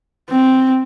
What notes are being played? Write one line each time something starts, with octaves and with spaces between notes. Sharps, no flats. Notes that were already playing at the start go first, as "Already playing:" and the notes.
C4